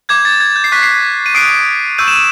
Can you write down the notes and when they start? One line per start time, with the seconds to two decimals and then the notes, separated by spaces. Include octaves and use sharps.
0.09 D6 G6 G#6
0.25 A6
0.40 G#6
0.56 G6
0.64 C7
0.72 C#6 F#6 B6
0.83 C7
1.26 D#7
1.35 D#6 F#6 C7 D7
1.98 C#6 E6 G6 D#7
2.08 E7